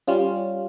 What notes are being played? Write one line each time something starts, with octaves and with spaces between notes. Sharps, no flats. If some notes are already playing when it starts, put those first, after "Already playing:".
G3 C#4 F4